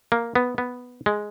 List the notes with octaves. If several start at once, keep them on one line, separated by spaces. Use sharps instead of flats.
A#3
B3
B3
G#3